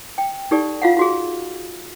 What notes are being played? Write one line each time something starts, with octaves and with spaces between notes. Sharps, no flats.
G5
D#4 G4 A4 D5
F4 F5 F#5
F4 F#4 G#4